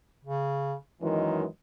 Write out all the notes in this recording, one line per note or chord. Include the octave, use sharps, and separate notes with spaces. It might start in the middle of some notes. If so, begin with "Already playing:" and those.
C#3
F#2 D#3 E3 G#3